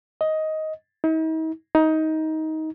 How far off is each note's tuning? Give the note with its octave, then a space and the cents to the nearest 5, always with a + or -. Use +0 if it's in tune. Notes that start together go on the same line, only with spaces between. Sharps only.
D#5 +10
D#4 +45
D#4 +20